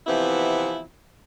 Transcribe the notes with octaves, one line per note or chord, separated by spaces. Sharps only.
C3 E3 F3 B3 C4 E4